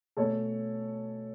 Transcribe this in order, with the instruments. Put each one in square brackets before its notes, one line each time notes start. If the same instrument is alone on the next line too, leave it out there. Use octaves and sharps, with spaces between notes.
[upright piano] B2 A3 C#4 A4 C#5